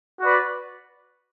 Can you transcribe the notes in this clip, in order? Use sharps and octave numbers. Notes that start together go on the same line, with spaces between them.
F#4 B4 D5